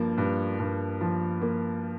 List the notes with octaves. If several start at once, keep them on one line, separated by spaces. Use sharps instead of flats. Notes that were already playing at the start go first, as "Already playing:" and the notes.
Already playing: G2 F3 A#3
G2
G2
F3
A#3